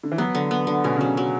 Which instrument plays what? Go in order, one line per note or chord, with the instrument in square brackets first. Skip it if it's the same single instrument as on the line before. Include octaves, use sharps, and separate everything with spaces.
[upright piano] D3
E3
[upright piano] F#3 [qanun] B3
[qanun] D3
B3
D3
[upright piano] B2 [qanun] C#4
[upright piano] C#3
[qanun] F#3
[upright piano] C#3
[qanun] F#3